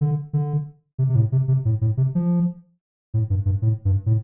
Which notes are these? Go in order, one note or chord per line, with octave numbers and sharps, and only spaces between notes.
D3
D3
C3
C3
A2
C3
C3
A2
A2
C3
F3
A2
G2
G2
A2
G2
A2